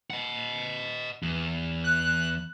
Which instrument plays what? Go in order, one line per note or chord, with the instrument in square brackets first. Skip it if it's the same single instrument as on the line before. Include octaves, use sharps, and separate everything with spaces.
[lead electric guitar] D#5 F#5
E2
[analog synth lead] F#6